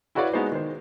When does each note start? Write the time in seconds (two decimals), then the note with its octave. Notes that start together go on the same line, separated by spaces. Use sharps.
0.15 E4 F#4 B4 C#5 D5 F5
0.33 G#3 B3 D#4 F#4 C5
0.52 D#3 C5